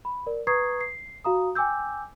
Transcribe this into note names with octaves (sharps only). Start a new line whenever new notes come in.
B5
A#4 D5
B4 A#5 C#6 D#6 G#6 C7
C7
F#4 F5 A#5 D#6
G5 G#5 D6 E6 G6